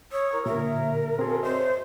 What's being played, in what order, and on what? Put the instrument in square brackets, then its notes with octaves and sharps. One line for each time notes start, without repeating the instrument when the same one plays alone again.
[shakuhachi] C#5 [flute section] D#6 E6
[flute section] E4 A#4 A#5
[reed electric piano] A#2 D3 [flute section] G4 E5 [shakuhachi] A#4
[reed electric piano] C4 G#4 A4 [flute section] F#4 C6
[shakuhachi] C5 [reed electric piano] C#5 D#5 E5